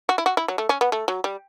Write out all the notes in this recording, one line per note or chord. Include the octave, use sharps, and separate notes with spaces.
F#4
E4
F#4
E4
F#3
A3
C#4
B3
A3
F#3
G3